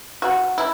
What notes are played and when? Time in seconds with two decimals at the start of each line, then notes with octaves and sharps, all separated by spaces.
0.22 F#4
0.58 E4